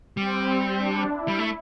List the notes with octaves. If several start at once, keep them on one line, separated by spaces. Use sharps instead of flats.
G3 C4
D4
E4
G3
A3